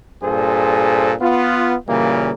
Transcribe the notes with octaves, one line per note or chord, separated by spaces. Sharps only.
G2 A#2 G#4 A4 C5
B3 F4
A#2 C#3 E3 G3 A#3